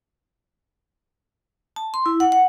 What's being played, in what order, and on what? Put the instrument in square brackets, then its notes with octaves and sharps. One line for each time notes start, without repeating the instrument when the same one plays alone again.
[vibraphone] A5
C6
E4
F#5
F#5